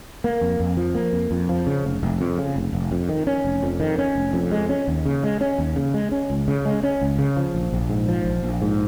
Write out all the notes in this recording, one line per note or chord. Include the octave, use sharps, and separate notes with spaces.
A#3
F2
F2
F3
A#3
F2
F2
F3
C#3
F1
F1
F2
C#3
F1
F1
F2
D#3
C#4
F1
F2
D#3
C#4
F1
F2
G#3
C#4
D#2
C#3
G#3
C#4
D#2
C#3
G#3
C#4
C#2
C#3
G#3
C#4
C#2
C#3
F3
A#1
A#1
G#2
F3
A#1
A#1
G#2